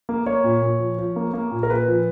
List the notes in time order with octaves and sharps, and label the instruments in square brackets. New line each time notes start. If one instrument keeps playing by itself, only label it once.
[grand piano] A#3
A#3 C#5
A#2
A#2
F3
F3
A#3
A#3
A#2
A#4
A#2 B4
F3